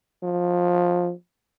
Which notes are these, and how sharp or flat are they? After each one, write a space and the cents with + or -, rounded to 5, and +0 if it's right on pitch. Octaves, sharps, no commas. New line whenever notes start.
F3 +15